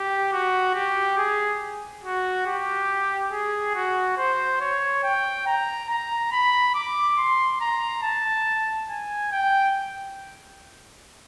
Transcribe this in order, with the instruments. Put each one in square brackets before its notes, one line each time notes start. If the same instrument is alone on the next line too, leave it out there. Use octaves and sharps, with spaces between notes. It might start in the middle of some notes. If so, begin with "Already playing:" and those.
Already playing: [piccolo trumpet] G4
F#4
G4
G#4
F#4
G4
G#4
F#4
C5
C#5
G5
A#5
A#5
B5
D6
C6
A#5
A5
G#5
G5